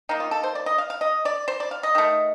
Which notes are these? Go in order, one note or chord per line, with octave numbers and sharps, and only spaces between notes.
D#3 A#3 D#4
F4
A4
C5
D5
D#5
F5
F5
D#5
D5
C5
D5
F5
D#5
D#3 A3